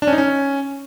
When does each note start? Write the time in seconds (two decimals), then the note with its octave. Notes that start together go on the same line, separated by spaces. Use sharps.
0.02 D4
0.07 C#4
0.13 D#4
0.18 C#4